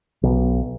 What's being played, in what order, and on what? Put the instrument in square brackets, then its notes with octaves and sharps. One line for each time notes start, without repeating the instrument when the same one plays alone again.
[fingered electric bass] B1